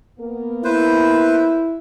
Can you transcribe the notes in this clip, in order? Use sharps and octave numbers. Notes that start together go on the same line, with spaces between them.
A#3 B3 A#4
E4 B4 C5